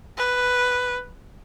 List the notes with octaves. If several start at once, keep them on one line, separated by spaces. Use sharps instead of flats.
B4